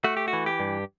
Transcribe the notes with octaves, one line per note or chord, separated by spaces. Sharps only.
A3 F#4
G4
F#4
E3
G4
G2